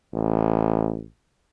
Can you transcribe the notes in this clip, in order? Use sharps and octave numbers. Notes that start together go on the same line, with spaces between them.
A1